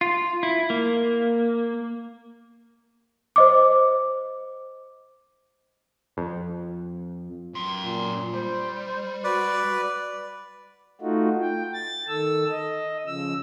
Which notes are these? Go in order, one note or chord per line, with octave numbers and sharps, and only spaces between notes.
F4
E4
A#3
C5 D#5 D6
F2
F#2 C6
A#2
G3 C5
F#4 B4 D5
A3 D#4 F4 F#4
G5
A6
D#3 A4 E6
D#5
C#3 F3 E6